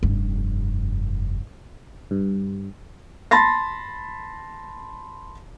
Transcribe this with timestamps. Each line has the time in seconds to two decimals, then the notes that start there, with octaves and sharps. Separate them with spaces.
0.03 F1 G2
2.11 G2
3.31 A5 B5 C6 A6 A#6